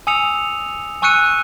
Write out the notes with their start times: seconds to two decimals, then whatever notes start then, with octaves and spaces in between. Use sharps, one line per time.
0.07 G#5 D#6 E6 C#7 F7
1.02 G#5 C#6 E6 F#6 C#7 D#7